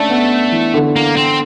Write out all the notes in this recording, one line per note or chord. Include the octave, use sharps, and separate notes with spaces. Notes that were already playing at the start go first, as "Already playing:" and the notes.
Already playing: A3 C#4 D4
B3
E3
D3
A#3
C4